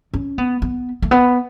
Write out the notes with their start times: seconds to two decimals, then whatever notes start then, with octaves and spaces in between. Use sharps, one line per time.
0.14 C#4
0.38 B3
0.62 B3
1.02 A3
1.11 B3